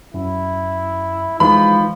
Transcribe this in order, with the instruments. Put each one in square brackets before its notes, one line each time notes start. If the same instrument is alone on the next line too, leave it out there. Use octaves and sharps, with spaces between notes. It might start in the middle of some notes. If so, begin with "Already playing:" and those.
[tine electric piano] F#2 [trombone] E4
[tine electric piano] E3 G#3 D#4 [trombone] F3 [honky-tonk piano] B5